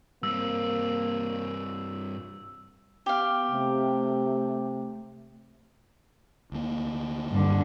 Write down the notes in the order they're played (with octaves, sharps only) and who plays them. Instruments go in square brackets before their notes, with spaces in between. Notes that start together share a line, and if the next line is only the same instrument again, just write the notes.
[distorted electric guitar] G2 C4 [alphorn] A#3 [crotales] E6
[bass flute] B3 [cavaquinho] G4 F5
[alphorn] C3 [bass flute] A3
[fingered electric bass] D2 A#3
[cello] G2 D3